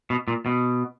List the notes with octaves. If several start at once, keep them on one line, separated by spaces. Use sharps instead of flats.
B2
A#2
B2